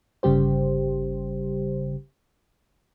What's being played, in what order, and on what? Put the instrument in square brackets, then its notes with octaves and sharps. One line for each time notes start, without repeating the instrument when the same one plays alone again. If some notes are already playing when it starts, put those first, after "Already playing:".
[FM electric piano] G1 C#3 G3 G4 C5